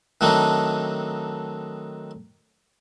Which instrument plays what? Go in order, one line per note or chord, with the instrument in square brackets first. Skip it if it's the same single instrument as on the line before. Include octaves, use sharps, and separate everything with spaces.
[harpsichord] D#3 F#3 A3 C4 D4 D#4